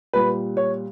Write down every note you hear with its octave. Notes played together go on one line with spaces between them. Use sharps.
A#2 G3 B4
C#5